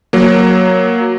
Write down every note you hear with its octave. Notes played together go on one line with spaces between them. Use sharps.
F#3 A#3